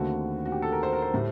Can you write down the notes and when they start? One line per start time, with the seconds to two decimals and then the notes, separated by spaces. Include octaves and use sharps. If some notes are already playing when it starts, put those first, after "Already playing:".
Already playing: D#2 D3 A3 C4 F#4
0.46 F#4
0.52 G4
0.62 A4
0.72 A#4
0.83 C5
0.93 A#4
1.02 C5
1.14 A2 G3